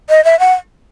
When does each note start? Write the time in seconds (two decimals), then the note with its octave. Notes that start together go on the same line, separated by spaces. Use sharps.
0.09 D#5
0.24 E5
0.39 F#5